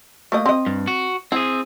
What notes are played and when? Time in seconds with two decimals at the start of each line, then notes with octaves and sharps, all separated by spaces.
0.32 A3 A#3 D#5
0.46 C4 D#5
0.66 G2
0.87 F#4
1.32 C4 E4 G#4